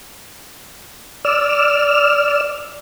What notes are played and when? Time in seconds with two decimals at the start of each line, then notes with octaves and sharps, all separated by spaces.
1.25 D5 E6 F6